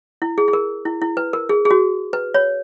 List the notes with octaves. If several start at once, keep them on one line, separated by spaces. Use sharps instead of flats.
E4
G#4
G#4
A#4
E4
E4
B4
A#4
G#4
G#4
F#4
B4
C#5